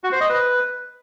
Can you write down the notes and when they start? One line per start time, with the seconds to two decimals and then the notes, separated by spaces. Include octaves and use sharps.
0.04 F#4
0.12 C5
0.21 D#5
0.29 B4